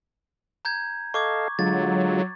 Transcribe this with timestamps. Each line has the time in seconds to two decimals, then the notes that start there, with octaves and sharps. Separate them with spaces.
0.65 A#5 G6 G#6
1.14 A4 D#5 F5 C#6 D6 G#6
1.59 D3 F#3 G#3 F4 A6